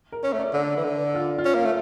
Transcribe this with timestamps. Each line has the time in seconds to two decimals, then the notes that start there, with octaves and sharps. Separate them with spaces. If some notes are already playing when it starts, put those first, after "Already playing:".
0.12 A#4
0.23 C#4 C#5
0.33 A3
0.39 D5
0.53 D3
0.77 E3
0.84 D3
1.15 F4
1.38 F4
1.45 C#4
1.55 A#3
1.65 A3